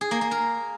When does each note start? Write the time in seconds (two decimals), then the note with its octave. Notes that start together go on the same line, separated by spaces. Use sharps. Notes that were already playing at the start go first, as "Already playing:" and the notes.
0.01 G#4
0.11 A#3
0.21 A#3
0.31 A#4